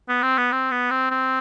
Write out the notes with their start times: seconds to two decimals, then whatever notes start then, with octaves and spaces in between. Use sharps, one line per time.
0.08 B3
0.22 C4
0.37 B3
0.52 C4
0.71 B3
0.90 C4
1.11 C4